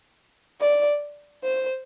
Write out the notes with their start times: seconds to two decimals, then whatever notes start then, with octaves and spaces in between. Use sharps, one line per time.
0.61 D5
1.44 C5